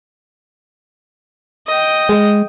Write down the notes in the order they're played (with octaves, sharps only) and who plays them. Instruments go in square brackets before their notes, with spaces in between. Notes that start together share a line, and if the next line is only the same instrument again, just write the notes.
[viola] D#5 G5
[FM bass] G#3